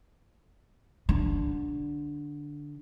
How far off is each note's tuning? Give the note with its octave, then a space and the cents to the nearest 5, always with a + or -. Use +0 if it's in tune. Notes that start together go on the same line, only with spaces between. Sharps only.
D3 -5